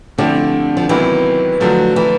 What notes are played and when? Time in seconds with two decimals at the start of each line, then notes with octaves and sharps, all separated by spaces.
0.18 D3 F3 A3 C4 E4 G4
0.77 F3
0.89 C3 D#3 E3 F#3 B3 E4
1.60 D3 F3 F#3 A3
1.96 E3